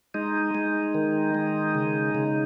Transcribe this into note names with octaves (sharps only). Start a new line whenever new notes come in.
G#3 D#4
G#3
D#3
G#3
C#3
C#3